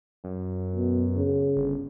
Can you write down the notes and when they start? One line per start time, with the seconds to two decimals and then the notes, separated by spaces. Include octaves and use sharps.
0.24 F#2
0.75 B2
1.16 C#3
1.56 G1